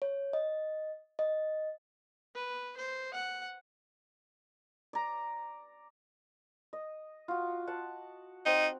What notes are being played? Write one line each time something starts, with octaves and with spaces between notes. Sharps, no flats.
C#5
D#5
D#5
B4
C5
F#5
D5 A#5
D#5
F4 F#4
F#5 A5
C4 D#4